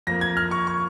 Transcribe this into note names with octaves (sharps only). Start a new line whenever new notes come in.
F2 F3 A#3 A#6
G#6
F6
C#6
C#6